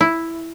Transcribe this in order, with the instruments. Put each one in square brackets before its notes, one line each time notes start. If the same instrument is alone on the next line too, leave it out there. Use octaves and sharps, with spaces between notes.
[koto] E4